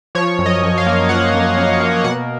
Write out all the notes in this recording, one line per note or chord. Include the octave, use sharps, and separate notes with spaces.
F3 C#5
F#2
D#5
F#2
F5
A#3
F3 F#5
F#2
F#2
A#3
B2 F#5